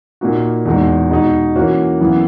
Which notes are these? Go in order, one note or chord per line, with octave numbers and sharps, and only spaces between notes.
A#2 A#3 D#4 F#4
E2 B2 G#3 D#4
B2 G#3 D#4
E3 A#3 C#4 F#4
F#2 E3 B3 E4